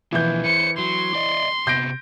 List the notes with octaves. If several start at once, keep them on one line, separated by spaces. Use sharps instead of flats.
B2 E3 F3 G6
B4 C5 C#7
F#3 C6
D5 D#5
C3 B3 G6 A#6 D7